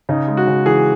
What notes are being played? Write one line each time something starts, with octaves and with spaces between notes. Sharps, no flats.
C#3 D#4
G#3
F#4
C#3
E3 G#4